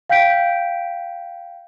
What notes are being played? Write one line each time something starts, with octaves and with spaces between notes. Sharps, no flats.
F5 G5 G6 B6 D7